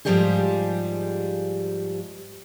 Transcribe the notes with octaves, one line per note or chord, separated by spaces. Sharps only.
G#2 C3 F3 G3 G4 G#4